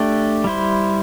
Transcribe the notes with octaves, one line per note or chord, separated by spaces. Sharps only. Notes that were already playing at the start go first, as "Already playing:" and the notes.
Already playing: A3 D4 G4 D5
G3 E4 C5